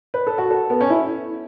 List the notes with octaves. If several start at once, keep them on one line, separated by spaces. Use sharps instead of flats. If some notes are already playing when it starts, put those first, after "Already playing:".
B4
A4
F#4
A4
B3
C#4
E4